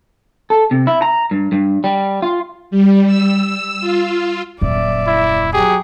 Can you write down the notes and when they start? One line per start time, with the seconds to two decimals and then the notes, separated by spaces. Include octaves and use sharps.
0.50 A4
0.71 C3
0.87 E4
1.02 A#5
1.31 G2
1.52 G2
1.84 G3
2.22 F4
2.71 G3
3.07 E6
3.81 F4
4.62 D#1 F#2 D5 E5
5.07 E4
5.53 F#3 G4 G#4